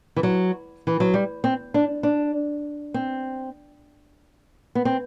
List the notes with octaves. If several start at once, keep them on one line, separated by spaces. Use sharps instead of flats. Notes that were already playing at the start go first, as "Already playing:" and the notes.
E3
F#3
E3
F#3
G3
C4
D4
D4
C4
B3
C4